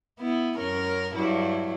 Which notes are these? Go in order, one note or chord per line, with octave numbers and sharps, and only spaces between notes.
B3 E4
F#2 C#4 A#4
G2 F#3 E4